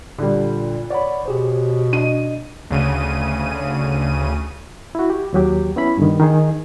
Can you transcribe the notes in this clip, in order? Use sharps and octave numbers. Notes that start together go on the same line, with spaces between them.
A#2 D3 G3
C#5 D5 F#5 B5
B2 G4 G#4 C5
D4 D#5 D#7
D2 C#3 D#7
E4 F#4
G4
D#2 F#3 G4
B3 C#4 E4 B5
G2 D3 D#3
D#3 D#4 G#4